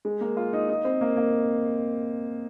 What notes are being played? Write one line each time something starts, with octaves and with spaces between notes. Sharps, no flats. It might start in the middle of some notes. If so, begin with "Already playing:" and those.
G#3
A#3
F4
D#4
D#4
C4
A#3
A#3